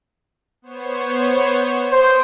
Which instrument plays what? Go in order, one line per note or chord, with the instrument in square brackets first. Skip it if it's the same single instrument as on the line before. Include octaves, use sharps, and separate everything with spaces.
[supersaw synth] B3 C5 C#5
[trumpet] C5 [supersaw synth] D#6 C7 D7